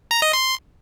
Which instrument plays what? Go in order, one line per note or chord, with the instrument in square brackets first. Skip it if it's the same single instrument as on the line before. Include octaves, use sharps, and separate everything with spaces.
[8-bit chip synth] A#5
D#5
C6